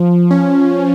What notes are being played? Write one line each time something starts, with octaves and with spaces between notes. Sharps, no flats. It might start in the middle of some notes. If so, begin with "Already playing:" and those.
Already playing: F3
C#4